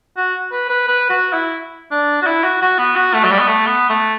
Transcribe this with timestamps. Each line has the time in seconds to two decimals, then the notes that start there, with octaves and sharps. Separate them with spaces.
0.17 F#4
0.52 B4
0.70 B4
0.88 B4
1.10 F#4
1.33 E4
1.91 D4
2.22 F#4
2.26 E4
2.44 F#4
2.62 F#4
2.78 B3
2.96 F#4
3.14 A3
3.25 F#3
3.31 G3
3.39 B3
3.48 A3
3.66 B3
3.90 A3